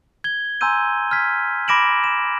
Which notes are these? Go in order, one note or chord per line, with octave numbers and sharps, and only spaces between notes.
G#6 G7
G#5 A#5 C6 E6 G6 D#7
F6 G#6 B6
B5 D6 A#6 D7 E7 F#7
E7